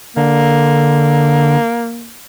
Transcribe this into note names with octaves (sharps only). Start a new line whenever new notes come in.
D3 A#3